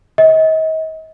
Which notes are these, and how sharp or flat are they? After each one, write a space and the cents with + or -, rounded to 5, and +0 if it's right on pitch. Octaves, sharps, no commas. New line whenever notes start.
D#5 +40